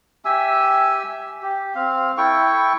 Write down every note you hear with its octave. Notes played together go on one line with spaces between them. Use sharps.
G4 E5 G#5 E6
G4
C4 F5
E4 A4 G5 C#6